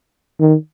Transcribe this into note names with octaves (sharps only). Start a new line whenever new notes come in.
D#3